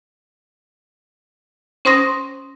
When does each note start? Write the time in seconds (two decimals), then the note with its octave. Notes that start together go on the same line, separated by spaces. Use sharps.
1.85 C#4 C5 C6 D#6 A#6